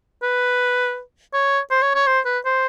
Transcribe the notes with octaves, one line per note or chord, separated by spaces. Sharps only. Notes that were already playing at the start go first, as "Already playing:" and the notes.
B4
C#5
C5
C#5
C#5
C5
B4
C5